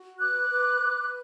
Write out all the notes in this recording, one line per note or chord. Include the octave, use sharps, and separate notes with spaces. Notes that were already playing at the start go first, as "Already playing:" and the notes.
Already playing: F#4
B4 D6 F#6
B4
B4